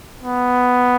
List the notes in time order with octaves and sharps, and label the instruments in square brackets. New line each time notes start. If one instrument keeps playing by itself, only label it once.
[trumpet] B3